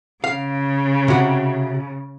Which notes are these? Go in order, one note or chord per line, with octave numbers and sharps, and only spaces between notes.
C#3 F5
C3 F#4